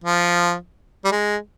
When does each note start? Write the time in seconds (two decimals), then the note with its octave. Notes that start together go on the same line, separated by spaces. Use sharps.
0.04 F3
1.04 G3
1.11 G#3